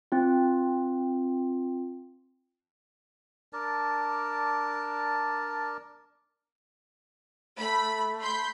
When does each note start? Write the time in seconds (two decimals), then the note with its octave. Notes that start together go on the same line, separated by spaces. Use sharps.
0.12 C4 F4
3.53 D4 A#4 D5 A5
7.58 A3 B5
8.20 B5 C6 G6